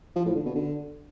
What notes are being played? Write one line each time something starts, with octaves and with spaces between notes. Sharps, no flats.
F3
A2
D3
B2
D3